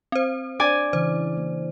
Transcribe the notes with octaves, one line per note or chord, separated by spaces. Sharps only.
C4 C5
D4 D5 G#5
C#3 E3 C5
A#3